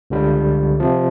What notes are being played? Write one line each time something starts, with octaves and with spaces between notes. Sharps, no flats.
C#2 D3 G3
C3 F3